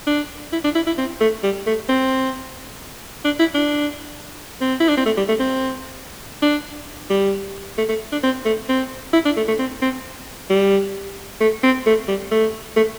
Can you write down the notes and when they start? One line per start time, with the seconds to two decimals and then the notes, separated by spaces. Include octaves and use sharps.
0.07 D4
0.53 E4
0.64 D4
0.75 E4
0.87 E4
0.98 C4
1.21 A3
1.43 G3
1.66 A3
1.89 C4
3.25 D4
3.39 E4
3.55 D4
4.61 C4
4.80 E4
4.89 D4
4.97 C4
5.06 A3
5.17 G3
5.28 A3
5.40 C4
6.42 D4
7.10 G3
7.78 A3
7.89 A3
8.12 D4
8.23 C4
8.45 A3
8.69 C4
9.13 E4
9.25 D4
9.37 A3
9.48 A3
9.58 C4
9.82 C4
10.50 G3
11.40 A3
11.63 C4
11.86 A3
12.08 G3
12.31 A3
12.76 A3